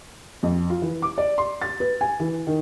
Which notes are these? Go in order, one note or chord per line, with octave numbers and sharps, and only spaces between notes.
F2
F4
E3
D6
D5
C6
A6
B4
G#5
E3
D#3